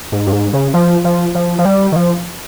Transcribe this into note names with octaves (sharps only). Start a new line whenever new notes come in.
G#2
G2
G#2
C#3
F3
F3
F3
F3
G3
D#3
F3